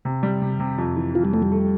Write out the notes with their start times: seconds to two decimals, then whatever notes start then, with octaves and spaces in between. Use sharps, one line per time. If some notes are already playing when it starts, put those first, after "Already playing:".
0.05 C3
0.23 G3
0.42 C3
0.60 C3
0.78 F2
0.96 E3
1.15 E3 F4
1.25 G3
1.33 F2 A3
1.42 G3
1.52 A3